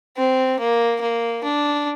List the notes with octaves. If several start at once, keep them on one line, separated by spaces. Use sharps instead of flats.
C4
A#3
A#3
D4